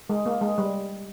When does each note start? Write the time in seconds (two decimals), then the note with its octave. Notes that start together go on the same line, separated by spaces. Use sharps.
0.09 G#3
0.26 A#3
0.41 G#3
0.58 G3